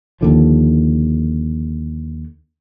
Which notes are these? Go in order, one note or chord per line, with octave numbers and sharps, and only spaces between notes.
D#2 D3 F3